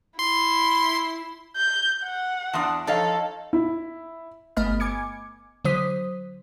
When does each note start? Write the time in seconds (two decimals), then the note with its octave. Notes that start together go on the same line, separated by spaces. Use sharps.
0.19 E4 C6
1.57 G6
2.04 F#5
2.53 E2 D4 A5 C6 D#6
2.87 F3 D#4 A4 C#5 F5 A5
3.53 E4
4.57 G1 A3 B3 D#5 B5 F6
4.80 G#5 D6 G#6 C#7
5.65 D3 F#3 C5 D#6 B6